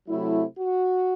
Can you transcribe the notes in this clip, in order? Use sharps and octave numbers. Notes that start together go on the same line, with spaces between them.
C3 F#3 A3 E4
F#4